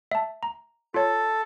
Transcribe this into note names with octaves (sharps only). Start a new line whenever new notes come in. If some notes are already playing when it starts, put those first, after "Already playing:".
E5 A5
A#5
F4 A4 C#5